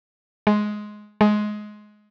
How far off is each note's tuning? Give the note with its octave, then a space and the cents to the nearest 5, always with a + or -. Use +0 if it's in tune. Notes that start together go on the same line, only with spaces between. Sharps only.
G#3 +10
G#3 +15